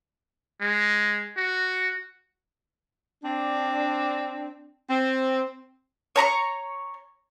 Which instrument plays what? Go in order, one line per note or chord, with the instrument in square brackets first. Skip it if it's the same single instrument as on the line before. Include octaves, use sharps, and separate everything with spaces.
[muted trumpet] G#3
F#4
[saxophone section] C4 D4
C4
[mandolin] C#5 A#5 B5 C#6